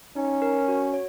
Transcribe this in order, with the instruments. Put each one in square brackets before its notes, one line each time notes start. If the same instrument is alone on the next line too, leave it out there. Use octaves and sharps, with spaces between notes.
[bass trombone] C#4 [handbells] D#4
[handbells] A#4
F#4
C#5